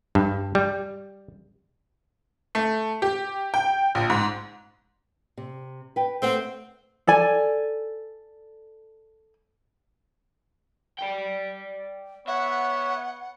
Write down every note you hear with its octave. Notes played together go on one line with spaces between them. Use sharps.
G2
G3
A3
G4
G5
A#1
G#2
C3
B4 G5
A3 C4 F#5
A4 D5 G#5
D5 G5
B3 C#5 E5 F#5